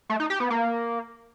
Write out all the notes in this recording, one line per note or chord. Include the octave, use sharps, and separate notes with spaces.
A3
D#4
G4
B3
A#3